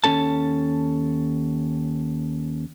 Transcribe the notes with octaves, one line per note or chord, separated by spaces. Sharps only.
D#2 G#3 C#4 A4 A5